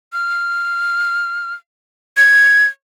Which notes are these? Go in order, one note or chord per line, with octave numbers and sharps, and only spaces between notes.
F6
G#6